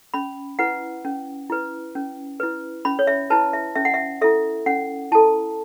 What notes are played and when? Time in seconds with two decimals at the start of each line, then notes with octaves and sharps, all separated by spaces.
0.14 C#4 B5
0.59 E4 B4 F#5
1.05 C#4
1.50 E4 B4
1.95 C#4
2.40 E4 B4
2.85 C#4 B5
2.99 C#5
3.07 E5
3.30 E4 B4 A5
3.53 E5
3.76 C#4 E5
3.85 F#5
3.94 E5
4.21 E4 A4 E5
4.66 C#4 F#5
5.12 E4 A4 A5